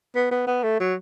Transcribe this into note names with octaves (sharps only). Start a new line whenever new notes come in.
B3
B3
B3
A3
F#3